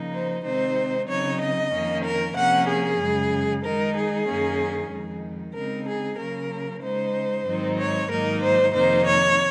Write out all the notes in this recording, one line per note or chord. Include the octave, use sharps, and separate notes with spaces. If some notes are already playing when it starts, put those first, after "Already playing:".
Already playing: C#3 F3 A#3 D#4
C5
C3 D#3 G#3 C4 D#4 C5
C#3 F#3 C4 D#4 C#5
D#5
F2 D#3 A#3 C#4
A#4
C3 F3 A#3 C#4 F#5
G#4
F#2 C#3 G#3
D#3 G#3 D#4 A#4
G#4
F#2 D#3 A#3 C#4
F2 D#3 G#3
C#3 G#3 C4 D#4 A#4
G#4
C#3 F#3 A#3 C#4 A#4
C#3 G#3 D#4 C5
G#2 D#3 F#3 C4 D#4
C#5
G#2 D#3 F#3 A#3 D#4 A#4
C5
F2 C3 D#3 A#3 D#4 C5
C#5